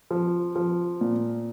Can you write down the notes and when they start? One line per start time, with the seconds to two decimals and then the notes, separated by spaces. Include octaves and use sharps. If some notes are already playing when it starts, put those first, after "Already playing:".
0.11 F3
0.56 F3
1.01 A#2